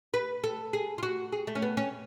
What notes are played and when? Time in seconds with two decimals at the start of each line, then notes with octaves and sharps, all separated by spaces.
0.14 B4
0.44 A4
0.73 G#4
0.98 F4
1.03 F#4
1.32 G#4
1.47 A3
1.55 C#4
1.62 B3
1.77 C#4